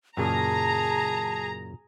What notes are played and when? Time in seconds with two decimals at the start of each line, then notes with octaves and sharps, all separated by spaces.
0.17 F#2 A#2 C#3 G#4 A5 A#5